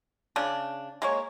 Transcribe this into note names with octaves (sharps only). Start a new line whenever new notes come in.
C#3 D4
G#3 A#3 C#5